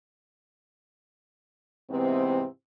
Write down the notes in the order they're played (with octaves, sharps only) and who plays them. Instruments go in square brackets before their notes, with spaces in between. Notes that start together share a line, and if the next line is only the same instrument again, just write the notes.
[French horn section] G#2 C3 E3 B3 C4